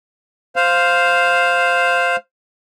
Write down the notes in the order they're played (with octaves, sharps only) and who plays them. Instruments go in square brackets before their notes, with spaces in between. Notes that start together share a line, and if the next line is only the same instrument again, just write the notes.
[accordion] C5 F5